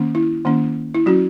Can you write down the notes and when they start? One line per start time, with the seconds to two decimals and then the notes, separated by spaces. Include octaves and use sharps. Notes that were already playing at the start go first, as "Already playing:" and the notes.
Already playing: D#3 A#3 C#4
0.15 E4
0.45 D#3 A#3 C#4
0.95 E4
1.06 F#3 C#4 F#4